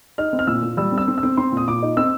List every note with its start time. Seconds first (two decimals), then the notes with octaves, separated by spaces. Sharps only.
0.18 D#4 F6
0.33 C4
0.39 F6
0.47 A#2 E6
0.63 A#2
0.77 G3 E6
0.92 C4
0.98 E6
1.08 C4
1.18 E6
1.23 C4
1.37 C4 C6
1.52 A#2 D#6
1.68 A#2 D6
1.83 D#4
1.97 C4 E6